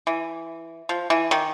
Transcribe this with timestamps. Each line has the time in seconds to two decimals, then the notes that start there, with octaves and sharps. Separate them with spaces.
0.07 E3
0.89 F3
1.10 E3
1.31 D#3